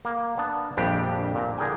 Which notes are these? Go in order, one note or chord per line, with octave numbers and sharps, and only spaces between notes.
A#3
B3 D4 A5
A#1 F2 G3 D4 G4
A#2 A#5
D3 E4 G#4 A#4 G5 G#5